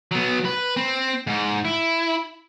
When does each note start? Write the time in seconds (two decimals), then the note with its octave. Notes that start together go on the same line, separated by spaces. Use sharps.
0.11 F#3 B3
0.45 B4
0.77 C4
1.27 G#2
1.65 E4